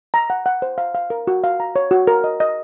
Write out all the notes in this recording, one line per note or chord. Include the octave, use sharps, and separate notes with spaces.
A#5
F#5
F#5
C5
F5
F5
A#4
F#4
F5
A#5
C#5
F#4
A#4
D#5
D#5